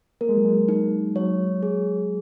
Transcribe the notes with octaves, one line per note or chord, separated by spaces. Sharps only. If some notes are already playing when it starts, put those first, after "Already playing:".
A#3 A#4
G#3
F#3
G#3
D#4
F#3 C#5
G#4